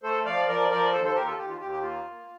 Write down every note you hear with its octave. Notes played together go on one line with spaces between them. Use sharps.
A3 A4 C5
F3 D5 F5
F3 A#4 D5
F3 A#4 D5
D#2 A4 C5
A4 C5
D#2 G4 A#4
F4 A4
D#2 G4
F4
D#2 G4
G4
A#3 F4
A#3